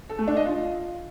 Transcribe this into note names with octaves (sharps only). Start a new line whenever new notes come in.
A4
A3
D4
D#5
F4